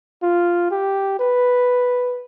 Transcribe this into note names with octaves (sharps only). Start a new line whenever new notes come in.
F4
G4
B4